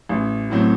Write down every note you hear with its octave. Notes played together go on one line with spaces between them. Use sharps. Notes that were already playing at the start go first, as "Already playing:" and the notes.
A1
A2 F#3 A3 C4